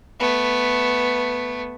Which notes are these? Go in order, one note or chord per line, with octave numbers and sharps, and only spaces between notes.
A3 B3